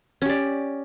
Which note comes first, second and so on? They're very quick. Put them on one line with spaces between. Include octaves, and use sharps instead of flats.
C#4 G4 D5